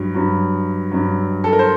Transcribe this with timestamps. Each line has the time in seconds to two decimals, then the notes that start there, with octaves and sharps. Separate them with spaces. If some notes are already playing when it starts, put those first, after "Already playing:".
Already playing: G2 F#3
0.14 G2 F#3
0.91 G2 F#3
1.44 A4
1.53 A#4
1.59 C5